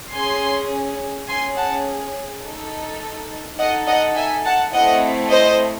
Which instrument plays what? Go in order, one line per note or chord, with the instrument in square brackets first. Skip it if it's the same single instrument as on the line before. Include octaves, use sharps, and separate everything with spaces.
[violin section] C#4 G#4 G#5 C6
C#4 G#4 G#5 C6
F#5 A5
D#4 A4
D#4 A4 D#5 F#5
D#5 F#5
E5 G#5
F#5 A5
A3 C4 E4 D#5 F#5
C5 D#5